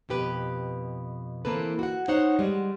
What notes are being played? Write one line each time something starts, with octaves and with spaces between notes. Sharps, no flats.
F2 B2 G4 B4
E3 F3 A#3 C4 A4 B4
F#4 F#5
D#4 C5 C#5 F#5
G3 G#3